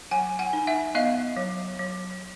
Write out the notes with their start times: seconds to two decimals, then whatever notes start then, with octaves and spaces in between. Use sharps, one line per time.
0.11 F#3 F#5 G#5
0.39 F#5 G#5
0.53 D#4
0.67 E5 F#5
0.95 B3 D#5 F5
1.37 F#3
1.79 F#3